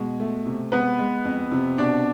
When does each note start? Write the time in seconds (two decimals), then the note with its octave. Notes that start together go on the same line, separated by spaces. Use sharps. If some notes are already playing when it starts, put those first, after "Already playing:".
Already playing: B2 G#3
0.20 A3
0.46 C3
0.72 G#3 B3 B4
0.99 G#3
1.25 F2
1.52 C3
1.78 B2 D4 D5